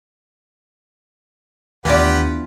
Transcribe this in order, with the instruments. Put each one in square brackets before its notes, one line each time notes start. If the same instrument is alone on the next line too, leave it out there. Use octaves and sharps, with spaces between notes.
[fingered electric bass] D#2 [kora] E3 F4 [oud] B3 D4 [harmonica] G4 B4 F#5